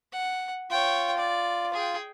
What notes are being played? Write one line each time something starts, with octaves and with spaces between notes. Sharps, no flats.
F#5
F4 C#5 G5
D5
G#4 G5